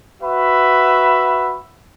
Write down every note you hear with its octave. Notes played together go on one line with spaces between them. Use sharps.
F#4 B4 E5 B5